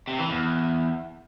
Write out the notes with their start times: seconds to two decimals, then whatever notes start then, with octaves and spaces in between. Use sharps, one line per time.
0.07 C3
0.18 E3
0.29 E2